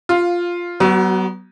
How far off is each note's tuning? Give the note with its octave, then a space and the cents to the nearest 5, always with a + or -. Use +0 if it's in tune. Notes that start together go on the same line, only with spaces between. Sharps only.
F4 +0 F5 +10
F#3 +35 B3 +0 F#4 +0